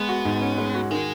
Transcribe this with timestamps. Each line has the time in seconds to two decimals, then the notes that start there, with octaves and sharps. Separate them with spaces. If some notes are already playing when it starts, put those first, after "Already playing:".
Already playing: G#3 B3
0.09 F#4
0.25 G#2
0.42 C#4
0.58 G#3
0.74 F#4
0.91 D#3 G#3